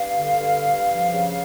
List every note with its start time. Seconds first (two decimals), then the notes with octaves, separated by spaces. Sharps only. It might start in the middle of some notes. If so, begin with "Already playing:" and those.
Already playing: G2 F5
0.11 D3
0.37 G2
0.61 G2
0.87 F3
1.12 C#3